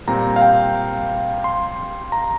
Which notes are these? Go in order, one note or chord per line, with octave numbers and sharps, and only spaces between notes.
A#2 G3 C4 A#5
F5
G5
C6
A#5